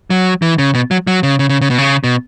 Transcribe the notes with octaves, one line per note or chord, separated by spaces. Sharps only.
F#3
E3
C#3
B2
F#3
F#3
C#3
C#3
C#3
C#3
B2
C#3
B2